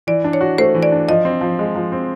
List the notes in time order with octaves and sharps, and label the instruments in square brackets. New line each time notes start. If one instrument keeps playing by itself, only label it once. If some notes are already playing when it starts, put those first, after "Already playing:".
[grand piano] E3 [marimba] D5
[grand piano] D4
[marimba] C#5
[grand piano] F#4
[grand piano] A3 [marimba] C5
[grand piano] E3
[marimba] D5
[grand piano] D4
[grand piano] F3 [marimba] D#5
[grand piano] C4
F3
G#3
F3
C4